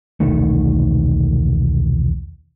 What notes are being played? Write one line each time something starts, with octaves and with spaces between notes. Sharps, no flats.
E1 C2 D#3 A3